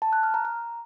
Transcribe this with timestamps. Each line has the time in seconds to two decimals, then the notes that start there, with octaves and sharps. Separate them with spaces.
0.02 A5
0.13 F#6
0.23 F6
0.34 A#5
0.45 A#5